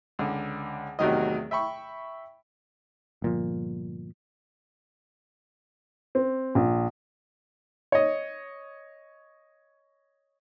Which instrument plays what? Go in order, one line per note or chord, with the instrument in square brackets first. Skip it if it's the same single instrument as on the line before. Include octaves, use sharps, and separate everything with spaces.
[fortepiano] C#2 D3
E2 A2 C3 D#3 F#3 D#5
E5 G5 B5 C#6
[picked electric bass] G1 A#2 F3
[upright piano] C4
A#1
[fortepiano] C#5 D#5